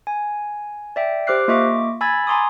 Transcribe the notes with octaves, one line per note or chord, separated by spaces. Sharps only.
G#5
D5 E5 G5
G4 C5 D6 F6 F#6 C7
A#3 F4 D#5 E5 C#6 D6
G#5 B5 E6 G#6 A6
G#5 A#5 C6 D6 D#6